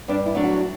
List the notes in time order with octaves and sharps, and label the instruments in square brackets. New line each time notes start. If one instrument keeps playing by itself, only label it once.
[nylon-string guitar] G2 D4
E4
F#3 A3 D4
F#4